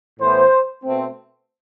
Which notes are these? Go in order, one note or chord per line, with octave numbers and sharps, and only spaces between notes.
A2 E3 B3 C5
B2 A3 C4